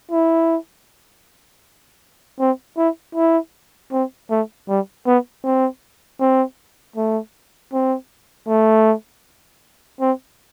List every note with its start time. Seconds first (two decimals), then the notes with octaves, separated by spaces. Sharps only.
0.11 E4
2.40 C4
2.77 E4
3.15 E4
3.92 C4
4.30 A3
4.68 G3
5.07 B3
5.44 C4
6.20 C4
6.96 A3
7.73 C4
8.48 A3
10.01 C4